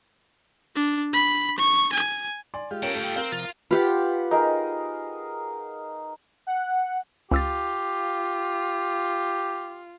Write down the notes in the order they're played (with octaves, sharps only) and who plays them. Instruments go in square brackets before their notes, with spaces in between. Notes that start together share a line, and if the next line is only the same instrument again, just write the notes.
[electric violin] D4
B5
C#6
G#5
[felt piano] D5 G#5 C6
[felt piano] G#3 [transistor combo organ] F4 G4
[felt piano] C#4 A#4 [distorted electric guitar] A4 G5
[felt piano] A3
[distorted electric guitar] C4 [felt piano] A#4 F5
[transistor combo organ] C3 F3 [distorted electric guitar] F4
[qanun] F4 G4 [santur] B4 F5 F#5
[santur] D#4 G#4 A#4
[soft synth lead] F#5
[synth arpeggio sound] C#2 E6 A6 [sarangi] F4 [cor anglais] G4